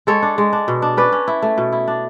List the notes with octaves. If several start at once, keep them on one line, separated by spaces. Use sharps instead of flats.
G#3 A4 C#5
D4
G#3
D4
B2
D4
C#4 B4 D5
C#4
E4
A3
B2
E4
D4